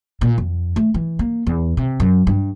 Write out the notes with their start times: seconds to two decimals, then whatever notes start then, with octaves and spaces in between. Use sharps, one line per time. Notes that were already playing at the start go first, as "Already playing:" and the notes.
0.21 A#2
0.38 F2
0.76 A3
0.94 E3
1.19 A#3
1.47 E2
1.77 C3
2.00 F#2
2.27 G2